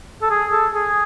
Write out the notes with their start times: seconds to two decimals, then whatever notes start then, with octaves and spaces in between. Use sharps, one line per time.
0.22 A4
0.31 G#4
0.52 A4
0.75 G#4